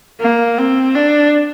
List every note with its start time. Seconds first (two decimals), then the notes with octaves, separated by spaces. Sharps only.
0.21 A#3
0.58 C4
0.95 D4